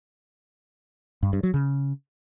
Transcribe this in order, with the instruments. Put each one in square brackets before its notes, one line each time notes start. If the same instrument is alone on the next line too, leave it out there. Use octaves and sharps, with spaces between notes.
[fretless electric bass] G2
G2
F#3
C#3